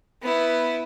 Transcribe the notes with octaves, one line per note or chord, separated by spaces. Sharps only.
B3 E4